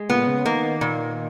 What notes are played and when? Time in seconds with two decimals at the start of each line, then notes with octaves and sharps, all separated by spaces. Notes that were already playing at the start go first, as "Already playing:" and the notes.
Already playing: G#3
0.10 A#2 B3
0.27 C#3
0.46 D#3 A#3
0.81 A#2